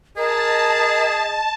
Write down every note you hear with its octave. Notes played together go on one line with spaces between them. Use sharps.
G#4 A#4 D#5 A5